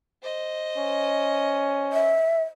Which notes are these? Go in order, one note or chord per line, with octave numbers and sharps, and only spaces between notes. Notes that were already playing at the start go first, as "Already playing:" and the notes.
C5 D#5
C#4
E5